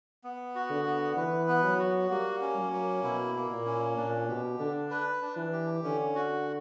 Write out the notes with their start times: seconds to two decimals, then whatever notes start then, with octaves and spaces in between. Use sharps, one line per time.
0.24 B3
0.55 F#4
0.70 D3
0.86 B3
1.17 E3 B4
1.48 B3
1.64 F#3
1.79 F#4
2.11 G3 A#3
2.41 C#4
2.57 F#3
2.73 A#3
3.03 B2 E4
3.35 A#3
3.50 A#2
3.66 C#4
3.97 A#2 D4
4.28 B2 G4
4.59 D3 D4
4.90 B4
5.22 D4
5.37 E3
5.52 G4
5.84 D3 C#4
6.15 F#4